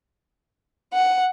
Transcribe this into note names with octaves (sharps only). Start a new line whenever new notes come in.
F#5